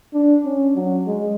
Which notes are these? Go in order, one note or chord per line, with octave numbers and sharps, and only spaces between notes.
D4
C#4
F#3
G#3